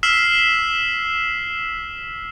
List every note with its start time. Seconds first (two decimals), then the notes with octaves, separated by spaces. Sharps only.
0.03 E6 F6 B6 C7 E7 F#7